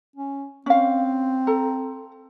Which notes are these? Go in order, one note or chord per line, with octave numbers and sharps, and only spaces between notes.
C#4
C4 C#4 F5
A4 A#5